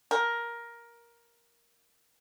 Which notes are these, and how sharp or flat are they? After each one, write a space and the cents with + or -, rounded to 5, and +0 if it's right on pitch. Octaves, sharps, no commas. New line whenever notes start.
A#4 +10